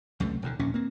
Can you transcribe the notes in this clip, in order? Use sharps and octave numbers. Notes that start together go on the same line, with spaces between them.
C#2 F#2 C3 A3
E1 D#2 D3
D#1 A#1 A#2 C#4
A#3 C4